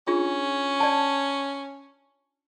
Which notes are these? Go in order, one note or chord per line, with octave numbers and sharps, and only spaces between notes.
C#4 D4 F4 G#4
D5 A5